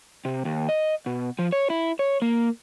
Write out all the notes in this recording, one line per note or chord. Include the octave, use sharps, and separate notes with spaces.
C3
D#2
D#5
B2
F3
C#5
E4
C#5
A#3